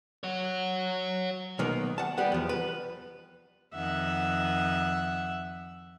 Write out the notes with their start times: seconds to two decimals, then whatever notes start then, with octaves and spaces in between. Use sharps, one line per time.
0.24 C#5 F#5
1.59 B1 D#3 A#3 B3
1.98 F#5 A5
2.18 G3 B3 F#5
2.32 E2 F3
2.49 B4
3.74 F2 D#3 E5 F#5